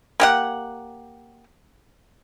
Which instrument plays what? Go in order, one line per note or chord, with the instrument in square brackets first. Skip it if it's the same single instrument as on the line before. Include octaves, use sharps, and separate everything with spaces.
[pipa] A#3 G4 F#5